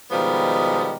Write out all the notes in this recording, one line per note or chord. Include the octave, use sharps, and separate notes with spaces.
B2 D#3 F3 G3 G#3 B3